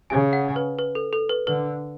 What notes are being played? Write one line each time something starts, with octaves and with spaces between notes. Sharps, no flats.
C#3 G#5
F#5
B4
B4
A4
A4
B4
D3 B4